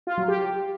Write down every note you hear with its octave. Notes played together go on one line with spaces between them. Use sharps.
F4
F#3
G4